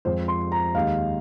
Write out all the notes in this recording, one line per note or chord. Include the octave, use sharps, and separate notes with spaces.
F2 F3 G#3 C5
C6
A#5
D#2 D#3 G#3 F5